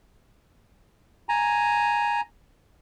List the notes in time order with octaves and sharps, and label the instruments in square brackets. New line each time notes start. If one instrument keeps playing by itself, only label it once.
[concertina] G#5 A#5